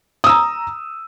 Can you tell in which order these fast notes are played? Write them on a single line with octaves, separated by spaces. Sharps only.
D#6 E6 A#5